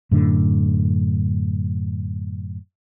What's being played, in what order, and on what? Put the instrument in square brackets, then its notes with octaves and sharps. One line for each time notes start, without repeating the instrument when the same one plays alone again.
[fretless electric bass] F#2 A2 D3